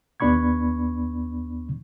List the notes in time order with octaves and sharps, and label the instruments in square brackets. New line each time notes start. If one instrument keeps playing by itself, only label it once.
[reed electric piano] D#2 B3 D4 B5 C#6 G#6